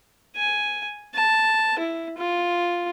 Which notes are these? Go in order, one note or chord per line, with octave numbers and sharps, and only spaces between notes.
G#5
A5
E4
F4